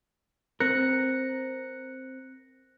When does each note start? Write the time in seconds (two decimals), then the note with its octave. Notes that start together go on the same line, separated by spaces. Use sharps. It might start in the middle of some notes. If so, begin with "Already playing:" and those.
0.60 C4 A#4 F#6 A#6 C#7